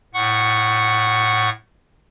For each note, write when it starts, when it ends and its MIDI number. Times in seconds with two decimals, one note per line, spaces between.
0.14 1.50 45
0.14 1.50 78
0.14 1.50 85